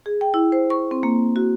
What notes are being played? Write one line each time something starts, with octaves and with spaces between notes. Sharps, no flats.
G#4
G5
E4
C5
C#6
C4
A#3
F#4